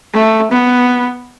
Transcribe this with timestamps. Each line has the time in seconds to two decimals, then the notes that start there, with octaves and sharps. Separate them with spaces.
0.13 A3
0.51 B3